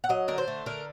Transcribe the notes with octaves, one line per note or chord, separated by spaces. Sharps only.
F#5
F#3 D#5
D3 A#4
C5
A3
D3 A#4